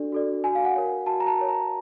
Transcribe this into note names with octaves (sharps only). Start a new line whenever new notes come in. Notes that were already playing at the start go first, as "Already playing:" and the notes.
Already playing: D4 F#4 A4 D5
F#4 A4 D5
F#4 G#5
F5
F#5
A#4 C#5
F#4 A5
A#5
A5
A#4 C#5
A#5